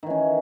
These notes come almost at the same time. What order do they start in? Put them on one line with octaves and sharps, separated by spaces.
D#3 E3 C#4